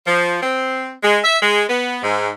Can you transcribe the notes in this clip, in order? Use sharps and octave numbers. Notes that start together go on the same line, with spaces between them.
F3
C4
G#3
E5
G#3
B3
G#2